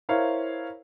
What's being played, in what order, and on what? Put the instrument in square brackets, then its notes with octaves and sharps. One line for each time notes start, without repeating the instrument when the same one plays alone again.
[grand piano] E4 A#4 C5 C#5 F5